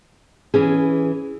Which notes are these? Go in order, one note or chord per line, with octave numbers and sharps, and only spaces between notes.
E3 C#4 G#4